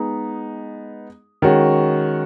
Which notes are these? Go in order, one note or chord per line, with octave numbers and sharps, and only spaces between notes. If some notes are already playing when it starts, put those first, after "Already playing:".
Already playing: G#3 B3 D#4 G#4
D#3 G#3 C#4 F#4